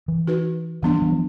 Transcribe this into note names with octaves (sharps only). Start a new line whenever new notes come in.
E3
D#4 F#4 B4
E3 G3 B3 D4
E3
F3